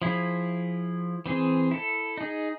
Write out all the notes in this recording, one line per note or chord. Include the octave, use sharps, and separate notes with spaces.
F3 E4 G#4
E3 C4 G#4
E4 A4
D#4 G#4